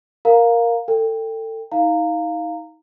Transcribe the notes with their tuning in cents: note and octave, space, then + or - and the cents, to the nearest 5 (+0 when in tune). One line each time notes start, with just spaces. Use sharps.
A#4 +0 F5 +10 A#5 +0
A4 +25 G5 +10
D#4 +30 F5 +0 A#5 -20